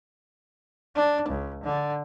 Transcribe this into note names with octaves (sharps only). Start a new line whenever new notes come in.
D4
C#2
D3